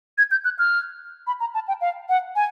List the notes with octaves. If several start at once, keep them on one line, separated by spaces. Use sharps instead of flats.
G#6
G6
F#6
F6
B5
A#5
A5
G5
F5
F#5
G#5